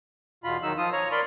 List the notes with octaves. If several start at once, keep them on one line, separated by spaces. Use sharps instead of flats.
E2 B2 F4 B5
D#3 F#3 D#4 E6
F3 F4 D#6
C#5 A#5
A#4 D5 B5 C6